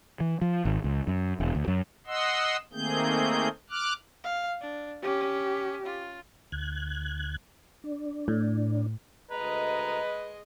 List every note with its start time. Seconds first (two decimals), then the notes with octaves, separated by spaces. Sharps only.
0.20 E3
0.42 F3
0.65 G#1
0.84 C#2
1.07 F#2
1.40 E1
1.55 D2
1.68 F#2
2.07 D#5 F#5 C6 E6
2.73 D#3 A3 A#3 C4 G#4 G6
3.70 D6 F6 F#6
4.24 F5
4.61 D4
5.02 C#4 G4
5.85 F4
6.52 D2 F#6 G#6
7.84 D4
8.28 A2
9.31 D2 G#3 B4 D#5 A#5